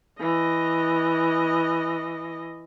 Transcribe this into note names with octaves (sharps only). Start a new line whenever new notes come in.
E3 D#5